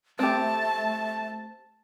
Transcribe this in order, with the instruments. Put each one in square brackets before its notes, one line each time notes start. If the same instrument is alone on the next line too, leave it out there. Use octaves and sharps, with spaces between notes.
[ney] A3 [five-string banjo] C4 G4 [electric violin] A5